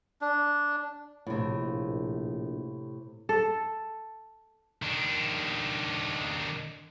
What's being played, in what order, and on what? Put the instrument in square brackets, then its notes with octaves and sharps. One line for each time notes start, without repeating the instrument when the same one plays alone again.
[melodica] D4
[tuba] A#1 [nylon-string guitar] A2 C3
[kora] A4
[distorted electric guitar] D#3 D4